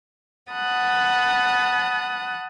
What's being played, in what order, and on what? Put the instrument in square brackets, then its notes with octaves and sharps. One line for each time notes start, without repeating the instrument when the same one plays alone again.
[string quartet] F#5 A5 B5 D#6 F#6